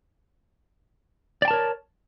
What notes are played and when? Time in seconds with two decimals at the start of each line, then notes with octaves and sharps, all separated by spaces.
1.42 D5
1.45 G5
1.48 A5
1.51 A#4
1.53 C#5